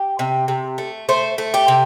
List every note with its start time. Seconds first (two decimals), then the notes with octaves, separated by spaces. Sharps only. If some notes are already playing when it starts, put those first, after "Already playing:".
Already playing: G4
0.19 C3
0.48 C3
0.78 A3
1.09 A3 C5
1.38 A3
1.54 G4
1.68 C3